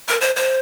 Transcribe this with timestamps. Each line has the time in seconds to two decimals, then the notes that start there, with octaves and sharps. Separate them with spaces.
0.08 A#4
0.21 C5
0.36 C5